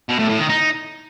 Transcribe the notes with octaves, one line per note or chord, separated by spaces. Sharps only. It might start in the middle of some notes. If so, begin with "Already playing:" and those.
B2
A2
A2
D#3
D#4